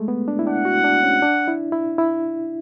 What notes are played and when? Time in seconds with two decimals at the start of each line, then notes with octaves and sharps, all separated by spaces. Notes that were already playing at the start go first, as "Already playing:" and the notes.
Already playing: G#3 A3
0.08 B3
0.28 D4
0.39 E4
0.47 D4 F#5
0.65 F#4
0.84 D4
1.03 C#4
1.22 D4
1.48 E4
1.72 E4
1.98 E4